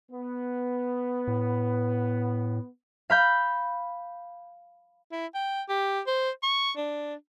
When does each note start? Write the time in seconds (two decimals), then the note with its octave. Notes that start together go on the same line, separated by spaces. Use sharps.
0.11 B3
1.28 A2
3.10 F5 B5 G6
5.12 E4
5.35 G5
5.69 G4
6.07 C5
6.43 C#6
6.76 D4